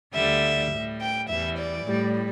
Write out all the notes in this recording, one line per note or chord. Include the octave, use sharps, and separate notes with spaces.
D2 D3 G3 E5
A2 G3
G5
E2 E3 G3 E5
D5
A2 G3